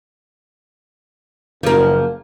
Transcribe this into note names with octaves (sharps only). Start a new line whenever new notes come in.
F#1 F3 A#3